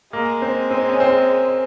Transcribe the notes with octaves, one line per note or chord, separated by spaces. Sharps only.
G#3 A#3
C4
C4
C#4
C4